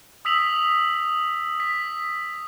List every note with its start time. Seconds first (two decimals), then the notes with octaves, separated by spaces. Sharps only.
0.25 D#6 E6 B6 F7 F#7
1.60 B6